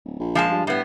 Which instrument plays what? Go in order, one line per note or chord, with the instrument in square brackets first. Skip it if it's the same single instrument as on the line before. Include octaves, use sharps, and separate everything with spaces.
[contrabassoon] D1
A#1
[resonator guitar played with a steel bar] F3 G#3 A5
[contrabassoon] G2
[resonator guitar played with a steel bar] A2 B3